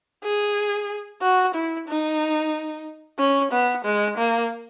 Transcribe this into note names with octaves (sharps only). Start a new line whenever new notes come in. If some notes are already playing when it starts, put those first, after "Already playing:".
G#4
F#4
E4
D#4
C#4
B3
G#3
A#3